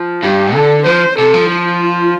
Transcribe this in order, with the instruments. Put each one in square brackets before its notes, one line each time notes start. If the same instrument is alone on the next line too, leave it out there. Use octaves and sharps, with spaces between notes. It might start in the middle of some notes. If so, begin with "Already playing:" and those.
Already playing: [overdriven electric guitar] F3
[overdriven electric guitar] G2 [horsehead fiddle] G4
[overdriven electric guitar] D3 [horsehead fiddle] A4
[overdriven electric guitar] F3 [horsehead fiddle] C5
[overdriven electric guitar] C3 [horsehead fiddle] A4
[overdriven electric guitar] F3
[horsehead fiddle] F4